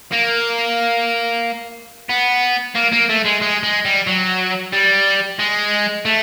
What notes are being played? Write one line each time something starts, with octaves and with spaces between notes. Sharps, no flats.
A#3
B3
A#3
A#3
A3
G#3
G#3
G#3
G3
F#3
G3
G#3
A3